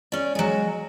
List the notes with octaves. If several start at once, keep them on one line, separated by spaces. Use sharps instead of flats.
C#4 D5
F#3 G#3